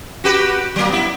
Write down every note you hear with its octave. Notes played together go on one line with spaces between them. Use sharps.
F#4 G4 B4
F#3 A#3
B3 E4